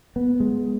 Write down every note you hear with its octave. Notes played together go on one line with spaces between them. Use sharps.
B3
G#3